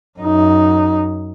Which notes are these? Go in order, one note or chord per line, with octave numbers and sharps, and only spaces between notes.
F#2 D#4